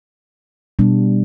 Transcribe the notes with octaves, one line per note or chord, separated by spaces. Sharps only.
B2 G3 B3 D4